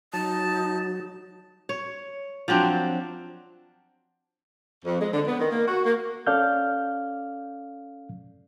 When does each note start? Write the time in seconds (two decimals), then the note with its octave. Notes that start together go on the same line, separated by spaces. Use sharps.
0.13 F#3 D#4 A5
1.69 C#5
2.48 F3 F#3 C4 D4
4.84 F2
5.00 G#3
5.13 D3
5.25 B3
5.39 D#3
5.51 A#3
5.68 F#4
5.84 A#3
6.27 C#4 A4 D5 F5 F6 G6